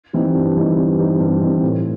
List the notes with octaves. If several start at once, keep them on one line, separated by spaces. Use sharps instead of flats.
E3 G3 C4 D#4
G2
E3 G3 C4 D#4
G2
E3 G3 C4 D#4
G2
E3 G3 C4 D#4
A2